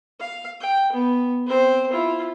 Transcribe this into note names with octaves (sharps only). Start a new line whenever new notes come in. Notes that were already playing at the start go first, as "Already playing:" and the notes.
F5
G5
B3
C4 C5
E4 F4